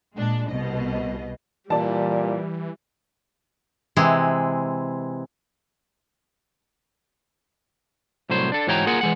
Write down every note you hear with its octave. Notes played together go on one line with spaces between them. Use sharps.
A#2 G#3 D4
C2 B2 D#5
A#2 E3 G3 D5 A5
C3 E3 G#3
C2 A2 F#3 C5
D4 A4
G#2 E3 F#4 C#5 G5 A#5
A#3 F4 G#4 A#4 F#5
E3 G#3 F#5